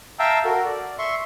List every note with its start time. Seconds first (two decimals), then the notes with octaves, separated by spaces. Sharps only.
0.19 E5 F5 G5 A5 A#5 E6
0.44 F#4 A4 A#4
0.65 D5
0.98 E5 C6 C#6